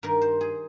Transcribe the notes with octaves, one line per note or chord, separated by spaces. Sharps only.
G2 D#3 A#4
C5
G#4